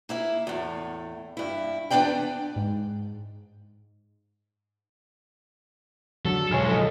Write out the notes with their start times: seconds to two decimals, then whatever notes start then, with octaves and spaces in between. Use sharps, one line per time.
0.09 A#3 E4 E5
0.47 E2 A2
1.37 G2 E4
1.91 E2 B3 C4 D4 D5 G5
2.56 G#2
6.25 D3 F#3 A4
6.51 B1 G#3 C#5 G#5 F6
6.67 F3 A4 D#5